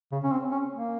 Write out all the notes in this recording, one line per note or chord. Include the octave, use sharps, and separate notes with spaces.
C#3
C#4
C4
C#4
A#3